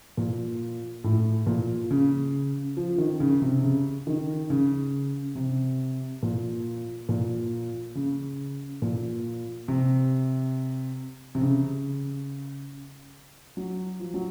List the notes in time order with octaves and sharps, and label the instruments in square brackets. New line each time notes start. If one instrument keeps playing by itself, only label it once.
[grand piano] A#2
A2
A#2
C#3
F3
D#3
C#3
C3
C#3
D#3
C#3
C3
A#2
A#2
C#3
A#2
C3
C3
C#3
F#3
F3
F#3